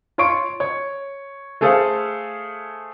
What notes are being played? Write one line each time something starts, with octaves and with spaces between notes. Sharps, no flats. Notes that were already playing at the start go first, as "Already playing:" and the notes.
F4 C#5 C6 C#6 D7
C#5
A3 G#4 A4 C5 F5